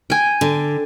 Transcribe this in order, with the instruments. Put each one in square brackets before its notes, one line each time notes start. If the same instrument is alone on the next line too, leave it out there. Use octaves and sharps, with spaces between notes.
[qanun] G5 G#5
[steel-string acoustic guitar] D3